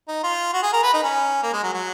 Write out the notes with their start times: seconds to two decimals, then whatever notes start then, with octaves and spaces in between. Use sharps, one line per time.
0.08 D#4
0.23 F4
0.53 F#4
0.63 G#4
0.73 A#4
0.83 B4
0.93 D#4
1.03 C#4
1.43 A#3
1.53 G#3
1.63 F#3
1.73 F#3